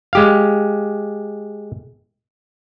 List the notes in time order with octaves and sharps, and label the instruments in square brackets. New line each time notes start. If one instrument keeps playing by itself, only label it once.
[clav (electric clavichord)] G#3 G4 F5